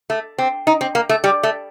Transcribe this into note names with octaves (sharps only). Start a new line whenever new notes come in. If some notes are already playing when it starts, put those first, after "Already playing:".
A3
C4
D#4
C4
A#3
A3
G3
A3